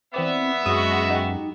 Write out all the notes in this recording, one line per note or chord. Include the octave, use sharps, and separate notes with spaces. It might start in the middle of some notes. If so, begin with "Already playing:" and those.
E3 B3 C4 D5 E5
F#2 G#3 F#4 D#6
D#4 G4